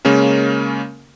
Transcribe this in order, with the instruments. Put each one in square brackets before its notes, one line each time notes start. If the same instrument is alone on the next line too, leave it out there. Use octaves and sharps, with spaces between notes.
[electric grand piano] C#3 G#3 A#3 C#4 A#4